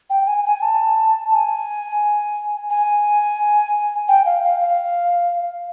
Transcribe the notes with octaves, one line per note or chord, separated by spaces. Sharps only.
G5
G#5
G#5
A5
A5
G#5
G#5
G5
F5
F5
F5